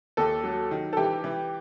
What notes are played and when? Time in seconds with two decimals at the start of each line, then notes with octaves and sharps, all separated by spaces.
0.17 D#2 A4
0.44 F#3
0.71 D#3
0.93 A4
0.97 E3 G4
1.24 E3